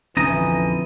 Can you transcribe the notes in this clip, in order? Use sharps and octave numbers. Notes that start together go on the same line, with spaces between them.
A#1 F2 D3 E3 C#4 D#5 A#5